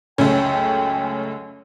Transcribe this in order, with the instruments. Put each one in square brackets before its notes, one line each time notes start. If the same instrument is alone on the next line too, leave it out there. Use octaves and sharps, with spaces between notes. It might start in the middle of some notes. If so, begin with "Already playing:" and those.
[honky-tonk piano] C#2 F#2 A3 [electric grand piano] C#4 [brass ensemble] G5